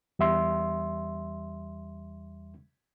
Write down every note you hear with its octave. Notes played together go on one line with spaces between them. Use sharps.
E2 G3 E5 C6